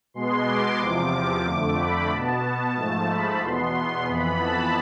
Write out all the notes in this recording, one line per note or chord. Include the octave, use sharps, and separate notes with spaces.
B2 G#3 B3 C6
D6
E2 C3 F3 D6
F2 D3 A3
B5
B2 B3 A5
A5
G#2 F3 A3
B5
E2 B2 B3 C6
C6
F2 E3 B3 B5
A5